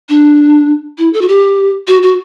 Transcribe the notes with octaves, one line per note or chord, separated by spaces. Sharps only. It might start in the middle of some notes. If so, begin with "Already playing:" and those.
D4
E4
A4
F#4
G4
F#4
F#4